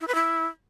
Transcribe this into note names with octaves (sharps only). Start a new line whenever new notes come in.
E4
B4
E4